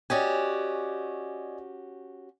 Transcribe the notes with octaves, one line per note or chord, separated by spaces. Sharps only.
C#4 F#4 G4 D5 D#5 G#5